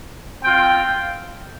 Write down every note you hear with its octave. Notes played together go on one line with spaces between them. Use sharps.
C4 F4 G5